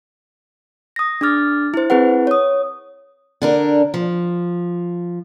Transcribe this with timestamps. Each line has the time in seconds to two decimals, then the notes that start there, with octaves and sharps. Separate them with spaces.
0.96 D#6 A#6
1.21 D4 G#4 D6 F6 A6
1.74 E4 C5
1.90 C4 E4 G#4 B4 F#5
2.27 C#5 D#6
3.42 D3 D4 A#4
3.94 F3